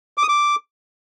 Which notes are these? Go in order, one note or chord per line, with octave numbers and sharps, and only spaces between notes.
D6
D#6
D6